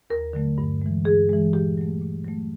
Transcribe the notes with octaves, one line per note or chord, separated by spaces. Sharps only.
D#2 A#4
D3 F#3 A3
G2
E3 G#3
G2 G#4
E3 G#3
A#2 G4
F#3 A3
A#2
F#3 A3